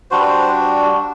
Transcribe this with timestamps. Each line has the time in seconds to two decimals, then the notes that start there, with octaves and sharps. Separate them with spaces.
0.11 G3 D4 F#4 C5
0.20 B4
0.29 C5